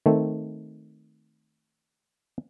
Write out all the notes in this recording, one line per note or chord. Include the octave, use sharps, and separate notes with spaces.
D#3 A3 C4